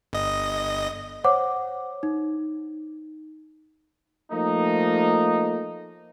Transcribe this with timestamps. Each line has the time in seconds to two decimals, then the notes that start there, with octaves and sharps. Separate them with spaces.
0.13 G1 D#5
1.24 C5 C#5 F#5 D6
2.03 D#4
4.31 F3 A3 A#3 D#4